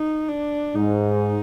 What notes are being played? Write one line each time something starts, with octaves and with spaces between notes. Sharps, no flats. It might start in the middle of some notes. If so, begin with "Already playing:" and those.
Already playing: D#4
D4
G#2 D#4